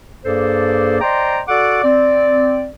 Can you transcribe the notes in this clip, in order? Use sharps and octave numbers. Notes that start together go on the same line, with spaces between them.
G2 A#3 G#4 A4 C5 D5
C5 D5 D#5 G5 A#5 C6
F#4 A4 D5 F#5 D6
C4 D5